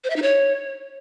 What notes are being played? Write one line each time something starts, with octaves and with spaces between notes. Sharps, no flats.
C5
E5
D#4
C#5